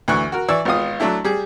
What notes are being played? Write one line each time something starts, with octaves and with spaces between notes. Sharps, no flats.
D2 E3 C#6 F#6
F#4 A#4
E3 D5 C#6 E6
G#1 B3 F4 D#6
F#3 A3 D4 E4
G3 G#4